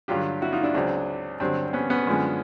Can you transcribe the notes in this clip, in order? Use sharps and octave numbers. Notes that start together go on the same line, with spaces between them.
G2 D3 F#3 F4 G4
E4 F#4
D#4 F4
D4 E4
C#2 C#3 F#3 C4 D4
G2 D3 F#3 C4 D4
C4
B3 C#4
B3 C#4
F#2 D3 F3 G#3